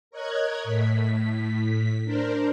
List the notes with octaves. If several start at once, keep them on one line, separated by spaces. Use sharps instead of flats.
A#4 C#5 D#5 F#6 G#6
A2 B6
D4 A#4 C5